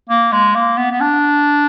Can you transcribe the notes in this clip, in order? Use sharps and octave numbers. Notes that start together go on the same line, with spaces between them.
A#3
G#3
A#3
B3
B3
D4